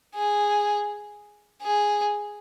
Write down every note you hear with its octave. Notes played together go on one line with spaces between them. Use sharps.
G#4
G#4